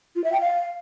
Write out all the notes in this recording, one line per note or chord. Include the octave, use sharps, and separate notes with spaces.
F4
E5
G5
F5